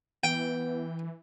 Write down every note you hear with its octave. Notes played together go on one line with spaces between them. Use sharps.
E3 B3 G5